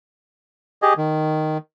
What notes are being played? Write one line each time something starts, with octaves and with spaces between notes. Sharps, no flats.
G4 G#4 D#5
D#3